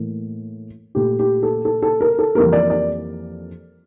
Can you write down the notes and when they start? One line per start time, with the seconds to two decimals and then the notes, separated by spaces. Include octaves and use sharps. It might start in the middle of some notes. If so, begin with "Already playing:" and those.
Already playing: A2 E3 A#3
0.95 A#2 A3 G4
1.19 G4
1.43 A4
1.65 A4
1.82 A4
2.01 A#4
2.19 A4
2.35 F2 E3 G3 A#3 A#4
2.53 D5
2.70 D5